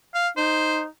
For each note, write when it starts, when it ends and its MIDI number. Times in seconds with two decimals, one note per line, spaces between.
0.15 0.28 77
0.37 0.87 63
0.37 0.81 72